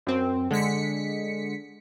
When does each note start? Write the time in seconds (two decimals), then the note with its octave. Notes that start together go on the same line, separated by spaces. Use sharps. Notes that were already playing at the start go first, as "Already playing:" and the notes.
0.07 F#2 C4
0.51 D3 G#3 B6 C#7